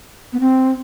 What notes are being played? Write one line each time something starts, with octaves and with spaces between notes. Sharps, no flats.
B3
C4